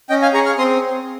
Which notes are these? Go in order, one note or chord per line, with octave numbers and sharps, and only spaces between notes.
C#4 D#5 G5
F5 G#5
G#4 A#5 C#6
C#6 F6
C4 C6 D#6